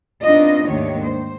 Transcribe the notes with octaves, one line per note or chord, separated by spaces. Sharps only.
B3 C4 D4 D#4 F4 D#5
D#2 G#2 D#3 A3 D4 C#5
C5